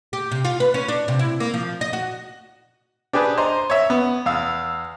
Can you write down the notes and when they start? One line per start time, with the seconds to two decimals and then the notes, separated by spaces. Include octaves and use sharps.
0.13 G4
0.31 C3
0.45 F4
0.60 B4
0.74 C#4
0.88 D4
1.08 C3
1.19 E4
1.40 A#3
1.54 F3
1.81 D#5
1.93 F#4
3.13 D4 G4 G#4 B4 A5
3.38 C5 D#5 A#5
3.70 C#5 E5
3.90 B3
4.26 E2 F5 E6